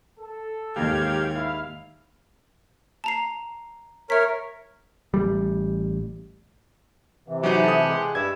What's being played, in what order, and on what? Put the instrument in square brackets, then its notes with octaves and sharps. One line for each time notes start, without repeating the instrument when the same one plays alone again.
[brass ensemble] A4
[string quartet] D#2 G#2 G#6 [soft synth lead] D#4 [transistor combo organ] G4 F5
[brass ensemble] E4 [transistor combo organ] F5
[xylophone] A5 A#5 C7
[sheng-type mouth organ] A#4 C#5 [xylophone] E5 B6
[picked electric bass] A1 G3
[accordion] C3 E3
[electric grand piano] F#3 D#4 [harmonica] G4 F#5 G#5
[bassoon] A3 [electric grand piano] A5 D#6
[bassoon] G#3
[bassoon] G2 [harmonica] E4 [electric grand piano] G#6